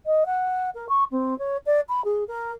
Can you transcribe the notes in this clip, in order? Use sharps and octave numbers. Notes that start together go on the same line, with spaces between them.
D#5
F#5
A#4
C#6
C4
C#5
D5
B5
G#4
A#4